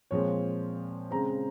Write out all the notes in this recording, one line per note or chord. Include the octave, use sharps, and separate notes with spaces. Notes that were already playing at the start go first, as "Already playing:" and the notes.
A#2 F3 G#3 C4 C#5
C#3 G#3 C4 A#5